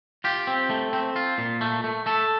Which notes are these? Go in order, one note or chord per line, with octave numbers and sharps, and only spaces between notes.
F4 G4
C4
A3
C4
F4
A#2
A3
A3
A3 A4